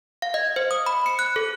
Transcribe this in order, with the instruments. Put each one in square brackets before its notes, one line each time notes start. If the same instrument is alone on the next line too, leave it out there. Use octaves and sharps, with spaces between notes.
[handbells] F5
D#5
C5
D#6
B5
C#7
F#6
A4